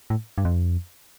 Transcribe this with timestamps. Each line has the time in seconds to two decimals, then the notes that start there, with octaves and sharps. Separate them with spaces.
0.10 A2
0.38 G2
0.45 F2